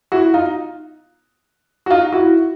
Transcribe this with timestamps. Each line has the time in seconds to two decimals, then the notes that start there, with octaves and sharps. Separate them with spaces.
0.12 E4 F#4
0.34 D#4 F4
1.86 F#4
1.90 D#4 F4
2.12 E4 F#4